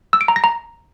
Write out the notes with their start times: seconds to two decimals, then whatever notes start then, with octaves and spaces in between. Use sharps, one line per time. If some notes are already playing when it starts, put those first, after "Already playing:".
0.13 E6
0.21 D7
0.28 A#5
0.36 A#6
0.44 A#5